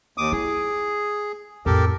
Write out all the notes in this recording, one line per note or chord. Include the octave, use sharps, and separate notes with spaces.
D#2 D6 D#6
E4 G#4
F2 A2 G4 A4 A#4